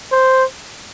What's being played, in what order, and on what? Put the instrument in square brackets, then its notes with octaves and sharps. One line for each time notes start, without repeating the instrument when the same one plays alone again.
[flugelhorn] C5